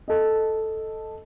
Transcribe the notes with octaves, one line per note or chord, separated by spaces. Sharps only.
A4 D#5